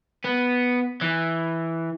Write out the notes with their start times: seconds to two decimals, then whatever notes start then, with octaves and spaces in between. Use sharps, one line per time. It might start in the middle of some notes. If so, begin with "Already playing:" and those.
0.24 B3
1.01 E3